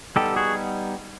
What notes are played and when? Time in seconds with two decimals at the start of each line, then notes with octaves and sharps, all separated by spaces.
0.16 G3 B3 D#4 G4 A4
0.36 F#4 G#4